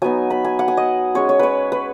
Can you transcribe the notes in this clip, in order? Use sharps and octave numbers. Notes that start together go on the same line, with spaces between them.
F#3 B3 D#4 G#5
B5
G#5
F#5
G#5
D#5
G#3 C#4 C#5
C#5
B4 C#5
B4